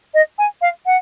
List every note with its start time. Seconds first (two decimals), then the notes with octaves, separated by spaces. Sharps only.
0.14 D#5
0.39 G#5
0.62 F5
0.86 F#5